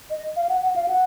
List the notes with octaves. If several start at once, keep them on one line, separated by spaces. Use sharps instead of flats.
D#5
F5
F#5
F#5
F5
F#5